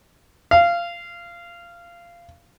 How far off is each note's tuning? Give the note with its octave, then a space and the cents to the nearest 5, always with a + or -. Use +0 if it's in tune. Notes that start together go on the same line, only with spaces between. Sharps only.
F5 -20